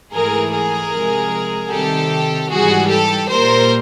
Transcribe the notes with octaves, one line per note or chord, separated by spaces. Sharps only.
G#2 E3 A3 G#4 A#4
G#4 A#4
C3 F3 G#3
C3 D#3 G3 G4 A4
G#2 E3 G3 F#4 G#4
G4 A4
A#2 G3 A#4 C5